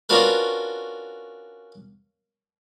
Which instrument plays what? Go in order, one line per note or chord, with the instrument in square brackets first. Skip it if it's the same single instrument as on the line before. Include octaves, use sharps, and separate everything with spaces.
[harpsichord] C#4 D4 F4 F#4 A#4 B4